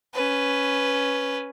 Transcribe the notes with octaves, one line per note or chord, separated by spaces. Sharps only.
C#4 B4